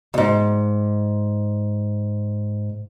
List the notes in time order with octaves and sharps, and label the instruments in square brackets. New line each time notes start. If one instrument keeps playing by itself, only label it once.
[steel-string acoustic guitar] F2 G#2